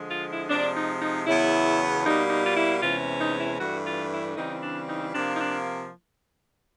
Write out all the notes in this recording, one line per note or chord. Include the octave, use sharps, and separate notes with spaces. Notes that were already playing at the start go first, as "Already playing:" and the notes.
Already playing: D3 F3 G#3
F4
E4
C3 F3 G#3 D4
D#4
D#4
E2 C#3 F#3 B3 E4
B2 G3 A#3 D#4
D#4
F4
E4
E2 C3 E3 G#3 C#4 F4
D#4
E4
G2 E3 A3 D4 F#4
F4
E4
C#3 E3 G3 C4 D#4
D4
D#4
C3 F3 A#3 D4
D#4
D4